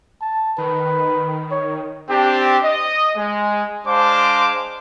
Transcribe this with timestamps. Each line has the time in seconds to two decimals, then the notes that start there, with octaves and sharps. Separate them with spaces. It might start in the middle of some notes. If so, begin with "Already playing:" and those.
0.21 A5
0.58 D#3 B4
1.51 C#5
2.10 C4 D4 G4
2.63 D#5
3.16 G#3
3.86 G#3 D4 C5 F5 A5 D6